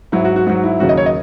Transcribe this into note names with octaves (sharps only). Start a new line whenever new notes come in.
G#2 F#3 E4
F#4
F#4
G#2 F#3 F#4
E4
D#2 C#3 F#3 F#4
D#5
C#5
D#5